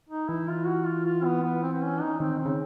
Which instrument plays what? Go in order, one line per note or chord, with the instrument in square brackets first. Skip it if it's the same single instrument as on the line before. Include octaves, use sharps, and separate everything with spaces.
[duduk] D#4
[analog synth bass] E3 [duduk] E4
[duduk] F4
F#4
F4
F4
B3
B3
C4
C4
C#4
D#4
[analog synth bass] D#3 [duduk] C4
[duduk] C4
[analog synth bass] C#3